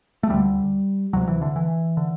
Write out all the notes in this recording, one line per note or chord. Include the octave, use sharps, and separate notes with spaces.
A3
D2 D3 G3
D2 C3 F#3
E3
D3
E3
D3